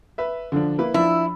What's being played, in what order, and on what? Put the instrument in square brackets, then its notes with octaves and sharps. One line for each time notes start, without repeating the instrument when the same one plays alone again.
[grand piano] B4 E5
D3 F3 D4
A#3 E4 B4
[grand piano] F3 D4 [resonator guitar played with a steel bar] E4